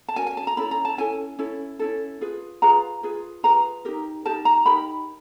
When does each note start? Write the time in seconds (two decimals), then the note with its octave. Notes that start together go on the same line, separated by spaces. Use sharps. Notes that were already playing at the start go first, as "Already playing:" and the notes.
0.08 A5
0.16 C#4 F#4 A#4 G#5
0.27 G#5
0.37 A5
0.47 A#5
0.57 C#4 E4 A4 B5
0.71 A#5
0.85 A5
0.98 C#4 E4 A4 G#5
1.39 C#4 E4 A4
1.79 C#4 E4 A4
2.21 F4 G#4 B4
2.62 F4 G#4 B4 A#5
3.03 F4 G#4 B4
3.43 F4 G#4 B4 A#5
3.85 D#4 G4 A#4
4.25 D#4 G4 A#4 A5
4.45 A#5
4.66 D#4 G4 A#4 B5